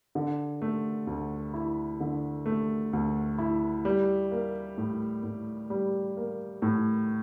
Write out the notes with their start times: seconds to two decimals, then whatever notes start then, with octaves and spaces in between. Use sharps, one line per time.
0.15 D3
0.62 A3
1.07 D2
1.54 E4
2.00 D3
2.46 A3
2.93 D2
3.39 E4
3.85 G3
4.32 A#3
4.77 A2
5.23 A2
5.70 G3
6.17 A#3
6.62 A2